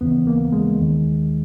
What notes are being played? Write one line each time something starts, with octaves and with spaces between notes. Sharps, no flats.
D#2 C#3 E3 B3
A#3
G#3
D#2 D#3